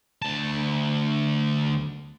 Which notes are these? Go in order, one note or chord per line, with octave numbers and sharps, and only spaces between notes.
D2 A5